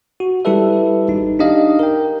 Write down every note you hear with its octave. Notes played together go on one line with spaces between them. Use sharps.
F#4
G3 E4 G4 A4 B4 E5
G#1 D#4
D4 D#4 G4 D#5 F5
A#4 G5